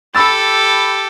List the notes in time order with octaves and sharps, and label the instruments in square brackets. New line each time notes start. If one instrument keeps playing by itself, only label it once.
[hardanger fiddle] G4 A4 [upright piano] B5 E6 A6